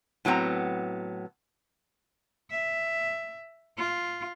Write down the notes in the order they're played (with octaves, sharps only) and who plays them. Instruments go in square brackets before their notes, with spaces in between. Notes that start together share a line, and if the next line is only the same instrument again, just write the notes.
[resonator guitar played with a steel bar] A2 F#3 B3 C4 A#5
[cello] E5
F4